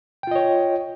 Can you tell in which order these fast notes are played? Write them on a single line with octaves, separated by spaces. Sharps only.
G5 F4 D#5 C#5